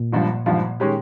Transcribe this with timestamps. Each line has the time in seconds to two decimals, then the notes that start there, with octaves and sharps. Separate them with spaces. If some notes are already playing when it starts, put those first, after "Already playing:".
Already playing: A#2
0.13 G#1 G2 F3
0.46 G#1 G2 F3
0.80 D#3 G#3 C#4 G4